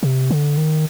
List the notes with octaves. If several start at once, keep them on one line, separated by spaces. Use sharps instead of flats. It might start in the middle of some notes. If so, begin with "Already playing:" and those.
C3
D3
D#3